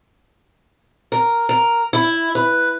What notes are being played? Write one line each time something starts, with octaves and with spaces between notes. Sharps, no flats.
A#4
A#4
E4
B4